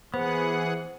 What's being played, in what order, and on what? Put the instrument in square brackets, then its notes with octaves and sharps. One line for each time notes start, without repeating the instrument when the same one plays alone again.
[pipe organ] E3 G#4 F#5 [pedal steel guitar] B3 [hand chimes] C5